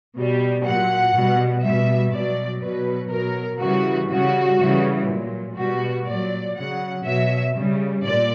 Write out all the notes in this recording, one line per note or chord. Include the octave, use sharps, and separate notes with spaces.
B2 G3
A#2 F#3 F#5
B2 G3
B2 G3 E5
B2 F#3 D5
B2 F#3 B4
B2 F#3 A#4
C#3 E3 G3 F#4
C#3 G3 F#4
C#3 E3 G3
A#2 F#3
B2 G3 F#4
A#2 F#3 D5
C#3 F#3 F#5
B2 F#3 E5
C#3 G3
A#2 D5